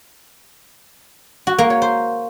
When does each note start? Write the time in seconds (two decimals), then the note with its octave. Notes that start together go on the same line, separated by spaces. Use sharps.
1.47 F#4
1.58 A#3
1.70 C#5
1.82 C5